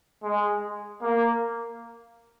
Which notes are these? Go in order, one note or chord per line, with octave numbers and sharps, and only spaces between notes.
G#3
A#3